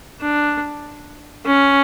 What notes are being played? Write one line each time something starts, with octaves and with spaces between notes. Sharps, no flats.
D4
C#4